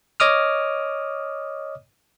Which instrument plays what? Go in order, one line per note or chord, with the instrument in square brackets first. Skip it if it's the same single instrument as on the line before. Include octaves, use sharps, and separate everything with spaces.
[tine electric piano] C#5 D#5 D6 D#6 F6